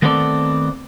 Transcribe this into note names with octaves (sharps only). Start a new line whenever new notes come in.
D#3 A3 B3 C4 A4 D5